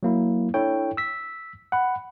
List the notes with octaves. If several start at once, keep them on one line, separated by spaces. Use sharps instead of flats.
F#3 A#3 E4
D4 E4 A4 C#5 G5
E6 B6
F#5 B5